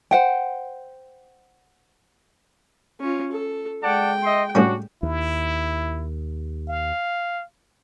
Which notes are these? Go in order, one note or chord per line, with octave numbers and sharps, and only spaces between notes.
C5 F#5 G5
C#4 F4
A4
G#3 D5 F#5 G5 A5
D#5 E5 C6
A2 G3 C#4 D4 F#4
D#2 E4
F5